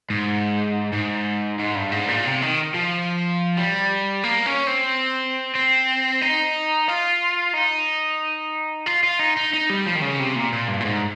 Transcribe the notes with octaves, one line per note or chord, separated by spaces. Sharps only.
G#2
G#2
G#2
G2
G#2
A#2
C3
D#3
F3
G3
A#3
C#4
C4
C4
D#4
F4
D#4
F4
F4
D#4
D#4
D#4
G3
F3
D#3
C#3
C3
A#2
A#2
G2
A#2
G#2